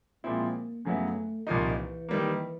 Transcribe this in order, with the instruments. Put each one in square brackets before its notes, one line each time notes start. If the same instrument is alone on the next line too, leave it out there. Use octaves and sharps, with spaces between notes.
[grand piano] A#2 F3 G#3 C4 E4 [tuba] A#3
[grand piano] F#2 C#3 F#3 B3 E4 [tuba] A3
[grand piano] C2 A#2 F3 A#3 D#4 [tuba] D#3
[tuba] E3
[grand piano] D#3 G3 A#3